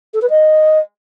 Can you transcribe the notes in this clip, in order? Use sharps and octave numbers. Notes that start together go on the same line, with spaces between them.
A4
B4
D#5